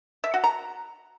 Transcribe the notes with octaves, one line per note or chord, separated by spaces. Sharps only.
E5
F#4
A#5